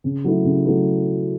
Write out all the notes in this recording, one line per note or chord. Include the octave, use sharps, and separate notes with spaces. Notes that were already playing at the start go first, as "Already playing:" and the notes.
C#3
F#3 A3 E4
C#3
F#3 A3 E4